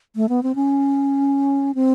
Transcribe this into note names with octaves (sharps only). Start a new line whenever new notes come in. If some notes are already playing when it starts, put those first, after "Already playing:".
A3
B3
C4
C#4
C4